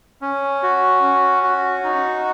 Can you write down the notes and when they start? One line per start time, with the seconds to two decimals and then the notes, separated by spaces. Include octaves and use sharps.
0.21 C#4
0.63 F#4
1.03 C#4
1.43 F#4
1.84 D#4